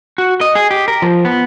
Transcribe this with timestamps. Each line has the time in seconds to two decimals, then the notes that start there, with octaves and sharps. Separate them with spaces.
0.18 F#4
0.41 D#5
0.55 G#4
0.71 G4
0.88 A#4
1.02 F3
1.25 B3